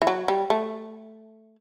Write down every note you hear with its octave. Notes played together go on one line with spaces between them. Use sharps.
E3
F#3
G3
A3